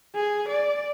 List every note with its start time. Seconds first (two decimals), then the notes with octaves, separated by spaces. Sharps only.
0.16 G#4
0.48 D5